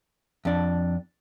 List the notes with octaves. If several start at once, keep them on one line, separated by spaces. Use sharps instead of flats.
F2 D4